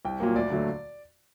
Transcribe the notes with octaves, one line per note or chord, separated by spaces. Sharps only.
C2 G5
A#2 F#3 A#3
D2 D5
D3 F#3 A3